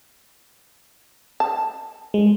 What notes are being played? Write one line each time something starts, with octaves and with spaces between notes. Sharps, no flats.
A5
G#3